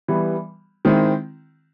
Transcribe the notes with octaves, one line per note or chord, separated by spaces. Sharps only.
E3 G3 B3
D#3 G#3 C4 E4